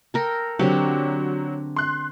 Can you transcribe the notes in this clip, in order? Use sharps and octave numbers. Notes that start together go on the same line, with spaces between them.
A4 A#4 G5
D3 F#3 C4 G4
C6 F#6